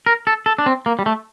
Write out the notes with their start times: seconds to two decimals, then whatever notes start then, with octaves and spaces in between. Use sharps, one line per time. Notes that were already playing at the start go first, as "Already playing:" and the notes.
0.06 A#4
0.27 A4
0.46 A4
0.58 D4
0.66 C4
0.86 A#3
0.99 G3
1.06 A3